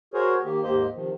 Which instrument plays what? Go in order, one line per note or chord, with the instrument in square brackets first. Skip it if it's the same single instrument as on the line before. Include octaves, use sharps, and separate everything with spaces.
[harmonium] F#4 G#4 A#4 C5 C#5
D#3 A#3 G4
D#2 G#2 A#3 G4 C5 D#5
C3 D#3 F3